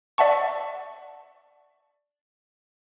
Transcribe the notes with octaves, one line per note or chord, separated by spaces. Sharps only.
D5 E5 F#5 A5 C#6